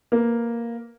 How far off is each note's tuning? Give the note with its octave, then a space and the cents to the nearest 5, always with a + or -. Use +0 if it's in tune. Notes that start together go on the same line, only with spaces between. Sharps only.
A#3 +0 B4 +0